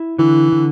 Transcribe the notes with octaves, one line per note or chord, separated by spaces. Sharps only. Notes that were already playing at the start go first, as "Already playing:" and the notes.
Already playing: E4
D3 E3
D3